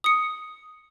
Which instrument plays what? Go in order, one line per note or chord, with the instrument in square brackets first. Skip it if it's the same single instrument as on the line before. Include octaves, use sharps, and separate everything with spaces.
[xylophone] D#6 C#7